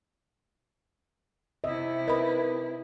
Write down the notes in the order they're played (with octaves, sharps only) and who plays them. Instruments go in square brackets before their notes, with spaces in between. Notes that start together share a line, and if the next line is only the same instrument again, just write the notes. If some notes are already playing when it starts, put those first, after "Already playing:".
[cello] C3 E4 [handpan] D#5 E5
[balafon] A#4 B5 [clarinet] B4 [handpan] D#5